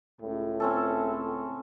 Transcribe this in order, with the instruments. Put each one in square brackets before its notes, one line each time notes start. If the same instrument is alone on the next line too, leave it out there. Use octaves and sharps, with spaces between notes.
[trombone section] C#2 A2
[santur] C4 C#4 A4